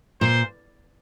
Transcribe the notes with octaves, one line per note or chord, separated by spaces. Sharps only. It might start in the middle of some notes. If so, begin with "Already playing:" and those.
A#2 C5